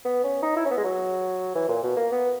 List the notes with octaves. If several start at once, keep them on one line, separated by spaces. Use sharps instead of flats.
B3
C#4
D#4
E4
C#4
B3
G#3
F#3
E3
A#2
B2
A#3
B3